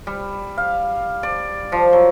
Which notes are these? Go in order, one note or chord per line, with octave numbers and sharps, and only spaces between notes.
G3
F5
D5
F3
F#3